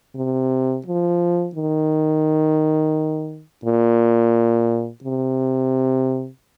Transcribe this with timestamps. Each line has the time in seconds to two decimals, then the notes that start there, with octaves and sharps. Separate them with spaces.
0.16 C3
0.86 F3
1.55 D#3
3.65 A#2
5.04 C3